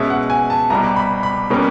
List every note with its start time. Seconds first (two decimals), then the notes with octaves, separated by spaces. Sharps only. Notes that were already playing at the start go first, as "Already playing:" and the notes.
Already playing: B2 G#3 C#4 E5
0.10 F#5
0.30 G#5
0.50 A5
0.70 C2 B2 G3 A#5
0.96 B5
1.23 B5
1.50 B2 G3 A#3 C#4